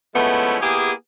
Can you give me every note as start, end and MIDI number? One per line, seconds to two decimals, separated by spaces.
0.15 0.57 53
0.15 0.57 56
0.15 0.57 57
0.15 0.57 59
0.15 0.57 61
0.15 0.57 64
0.61 0.92 58
0.61 0.92 59
0.61 0.92 64
0.61 0.92 67
0.61 0.92 68